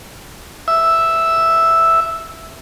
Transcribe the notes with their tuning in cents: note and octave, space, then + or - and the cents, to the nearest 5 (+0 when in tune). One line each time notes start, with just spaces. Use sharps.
E5 +0 E6 +0